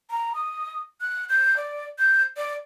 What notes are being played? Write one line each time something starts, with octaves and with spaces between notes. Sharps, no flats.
A#5
D#6
F#6
G6
D5
G6
D5